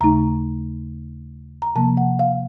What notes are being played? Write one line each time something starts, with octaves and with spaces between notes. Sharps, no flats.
D#2 C#3 A3 D#4 A#5
A#5
C3 F3 A#3 A5
F#5
F5